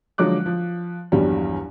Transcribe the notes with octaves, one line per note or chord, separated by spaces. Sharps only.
D3 F3 F#3 G#3 D6 F#6
F3
A#1 E2 G2 F#3 G3